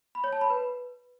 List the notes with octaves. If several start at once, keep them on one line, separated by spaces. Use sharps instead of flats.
B5
C#5
A5
B5
B4